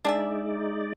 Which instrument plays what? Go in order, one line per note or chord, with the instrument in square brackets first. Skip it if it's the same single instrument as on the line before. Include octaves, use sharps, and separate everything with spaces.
[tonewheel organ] G#3 D#4 D5 [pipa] D4 G#4 E5